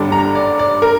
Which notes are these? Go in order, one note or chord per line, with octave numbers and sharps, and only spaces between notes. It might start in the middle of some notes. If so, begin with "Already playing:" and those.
Already playing: G1 G2 D3 G3 D4
A#5
D5
D5
A#4